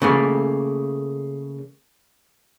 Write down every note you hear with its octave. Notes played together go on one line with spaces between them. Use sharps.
C#3 A3 A#3